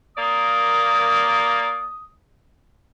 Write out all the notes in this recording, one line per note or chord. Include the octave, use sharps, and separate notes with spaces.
A#3 D5 D#6